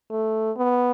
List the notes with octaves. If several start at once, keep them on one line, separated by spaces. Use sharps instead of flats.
A3
B3